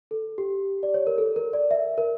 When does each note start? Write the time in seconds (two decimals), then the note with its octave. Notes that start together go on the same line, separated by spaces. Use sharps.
0.11 A4
0.38 G4
0.83 D5
0.94 C#5
1.07 A#4
1.18 A4
1.36 A#4
1.53 D5
1.71 E5
1.98 A#4